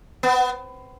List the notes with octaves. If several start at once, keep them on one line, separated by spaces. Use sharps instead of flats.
B3